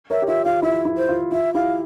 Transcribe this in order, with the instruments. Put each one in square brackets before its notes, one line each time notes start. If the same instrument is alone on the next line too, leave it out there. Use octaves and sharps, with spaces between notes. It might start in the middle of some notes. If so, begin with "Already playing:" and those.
[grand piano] A#4 C#5 [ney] E5
[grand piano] G4
[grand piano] F4 [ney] E5
[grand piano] F4 [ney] F5
[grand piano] E4 [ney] E5
[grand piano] E4
[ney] C5
[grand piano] F4
[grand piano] F4 [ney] E5
[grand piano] E4 G4 [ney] F5